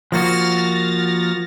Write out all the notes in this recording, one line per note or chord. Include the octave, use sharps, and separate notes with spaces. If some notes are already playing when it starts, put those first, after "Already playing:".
F3 A#3 F#4 F6 A6 A#6